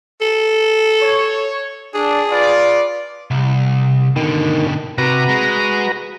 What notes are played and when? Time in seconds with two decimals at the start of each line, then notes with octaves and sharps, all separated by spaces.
0.21 A4
1.02 C#5
1.94 D4 G#4
2.30 F4 B4 D5
3.31 C2
4.16 B2 D3 D#3
4.98 C3 F#4 B4 A#5
5.29 G#3